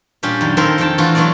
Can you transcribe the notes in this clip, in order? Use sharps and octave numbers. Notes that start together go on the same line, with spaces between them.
A#2 G3 C#4 D4 G4
F#2 D#3
D#3 F3 C4 A4 A#4 C5
F2 D#3 G5 A5
E3 A3 D4 F4 F#4
F#3 A3 B3 D4 D5